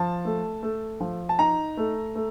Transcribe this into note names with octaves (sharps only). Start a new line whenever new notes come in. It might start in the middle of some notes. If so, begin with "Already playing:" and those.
Already playing: F3 A5
A3
A3
F3
A5
D#4 A#5
A3
A3